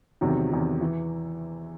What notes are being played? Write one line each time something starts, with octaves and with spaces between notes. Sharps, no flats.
E2 C3 D#3 F#3
E2 C3 D#3 F#3
E3